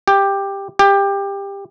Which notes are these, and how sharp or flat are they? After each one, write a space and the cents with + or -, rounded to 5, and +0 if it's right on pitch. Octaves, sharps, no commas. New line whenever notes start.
G4 +10
G4 +20